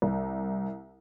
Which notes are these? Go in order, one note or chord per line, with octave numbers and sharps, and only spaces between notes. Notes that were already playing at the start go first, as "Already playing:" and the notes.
C2